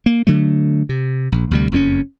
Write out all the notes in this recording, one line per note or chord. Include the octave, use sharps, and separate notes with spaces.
A#3
D3 F#3 A3
C3
A#1
D2 C3 G3
F#1 F2 C4 C#4